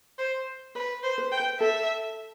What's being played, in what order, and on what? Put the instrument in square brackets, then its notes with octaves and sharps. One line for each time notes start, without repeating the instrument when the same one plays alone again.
[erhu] C5
[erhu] B4 [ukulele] C5
[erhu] C5
[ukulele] B4
[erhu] G5
[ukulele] B4
[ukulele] A4 [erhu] E5